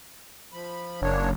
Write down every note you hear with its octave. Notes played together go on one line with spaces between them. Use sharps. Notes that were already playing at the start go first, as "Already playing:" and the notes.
F3 B5
F#1 A#3 D4 C#5